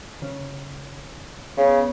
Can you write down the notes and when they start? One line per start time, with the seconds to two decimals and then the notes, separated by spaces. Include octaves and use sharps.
0.22 C#3
1.57 C#3 B3